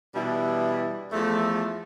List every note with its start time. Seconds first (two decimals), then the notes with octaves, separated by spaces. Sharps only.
0.14 B2 E3 G3 D4 E4
1.13 E2 F3 A3